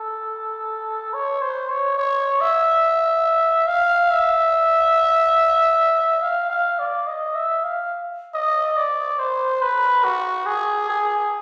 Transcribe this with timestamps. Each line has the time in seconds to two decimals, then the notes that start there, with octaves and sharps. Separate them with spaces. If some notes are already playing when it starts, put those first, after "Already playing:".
Already playing: A4
1.14 C#5
1.42 C5
1.70 C#5
1.98 C#5
2.41 E5
3.67 F5
4.10 E5
6.23 F5
6.50 F5
6.79 D5
7.07 D#5
7.35 E5
7.64 F5
8.34 D#5
8.77 D5
9.19 C5
9.62 B4
10.04 F#4
10.46 G#4
10.89 G#4